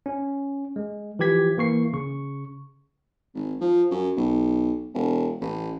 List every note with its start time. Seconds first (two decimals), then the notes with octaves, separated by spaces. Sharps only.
0.06 C#4
0.76 G#3
1.19 E3 F3 G4 G#6 B6
1.57 E3 A#3 C#6 C7
1.93 C#3 C#6
3.34 G#1
3.60 F3
3.91 F#2
4.16 B1
4.94 E1
5.41 A1